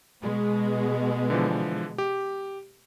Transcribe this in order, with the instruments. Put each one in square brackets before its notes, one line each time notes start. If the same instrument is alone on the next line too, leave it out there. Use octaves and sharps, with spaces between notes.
[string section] B2 G#3
[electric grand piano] D3 E3 F3
G4